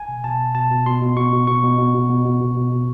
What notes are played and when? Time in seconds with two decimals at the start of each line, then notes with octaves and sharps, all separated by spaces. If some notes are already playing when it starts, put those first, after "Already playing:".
Already playing: G#5
0.09 B2
0.24 B2 A5
0.39 B2
0.55 B2 A5
0.71 B2
0.86 B2 C6
1.01 B2
1.16 B2 C#6
1.33 B2
1.47 B2 C#6
1.63 B2
1.78 B2
1.94 B2
2.10 B2
2.25 B2
2.41 B2
2.56 B2
2.72 B2